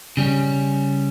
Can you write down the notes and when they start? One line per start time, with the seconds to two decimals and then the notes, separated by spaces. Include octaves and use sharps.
0.17 C#3 G3 C#4